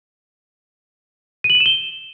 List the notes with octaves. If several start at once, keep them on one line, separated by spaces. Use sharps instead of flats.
D#7
F#7
D#7
E7
G7